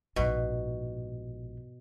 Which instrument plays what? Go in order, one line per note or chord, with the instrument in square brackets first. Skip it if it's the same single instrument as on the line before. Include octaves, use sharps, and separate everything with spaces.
[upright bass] A#1 G#2 [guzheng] B2